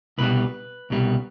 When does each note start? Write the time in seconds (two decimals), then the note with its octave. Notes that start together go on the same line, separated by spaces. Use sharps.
0.18 C2 B2 G3 B4
0.90 C2 B2 G3